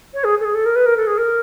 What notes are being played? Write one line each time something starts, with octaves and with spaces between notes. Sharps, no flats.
C#5
G#4
A4
G#4
A4
A#4
B4
A#4
A4
G#4
A#4